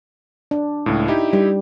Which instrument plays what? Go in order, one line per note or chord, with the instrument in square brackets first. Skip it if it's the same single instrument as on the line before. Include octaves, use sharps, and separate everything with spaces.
[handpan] D4
[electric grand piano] C#2 A2
D#4 E4 G4
[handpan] G3